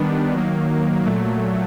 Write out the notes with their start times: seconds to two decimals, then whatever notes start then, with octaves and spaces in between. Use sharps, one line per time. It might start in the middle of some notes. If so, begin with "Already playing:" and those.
Already playing: D#3 G3 B3 D4
0.33 D#3 F#3 A#3
1.06 A#2 F#3 A3